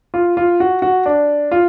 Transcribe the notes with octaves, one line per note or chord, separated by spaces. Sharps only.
F4
F4
F#4
F#4
D4
F4